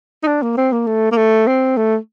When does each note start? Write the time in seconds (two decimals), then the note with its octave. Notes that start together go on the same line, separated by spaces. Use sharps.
0.23 D#4
0.27 D4
0.42 A#3
0.57 C4
0.72 A#3
0.87 A3
1.12 A#3
1.17 A3
1.47 C4
1.77 A3